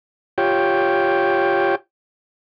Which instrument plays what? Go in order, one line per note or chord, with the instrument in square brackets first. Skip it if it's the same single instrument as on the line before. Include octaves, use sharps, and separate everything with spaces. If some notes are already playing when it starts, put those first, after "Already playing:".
[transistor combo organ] F4 G4 C#5 G5